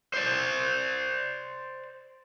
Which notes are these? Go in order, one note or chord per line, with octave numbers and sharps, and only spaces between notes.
C5 D5